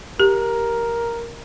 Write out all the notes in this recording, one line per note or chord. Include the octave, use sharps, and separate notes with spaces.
G4 A#4